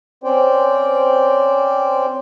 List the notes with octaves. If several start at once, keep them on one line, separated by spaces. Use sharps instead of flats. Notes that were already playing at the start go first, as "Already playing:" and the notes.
C4 C#4 C5 D5 G5